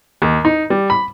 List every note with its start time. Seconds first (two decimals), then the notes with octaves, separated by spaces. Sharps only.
0.22 D#2
0.45 D#4
0.70 G3
0.90 B5